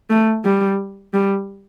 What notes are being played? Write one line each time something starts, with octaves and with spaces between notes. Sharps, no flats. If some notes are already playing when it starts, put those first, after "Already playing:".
A3
G3
G3